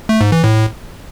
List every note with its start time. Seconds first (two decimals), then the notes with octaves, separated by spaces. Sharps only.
0.09 A3
0.21 G#2
0.32 E3
0.44 A2